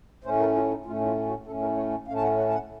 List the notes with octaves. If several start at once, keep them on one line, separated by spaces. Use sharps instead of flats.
A2 A3 C#4 C5
A#4
F4
D#4
A2 A3 C#4 F4
D#4
F4
F#4
A2 A3 C#4 A4
A#4
C#5
A2 A3 C#4 F5
A5
F#5
F#5
A5
F#5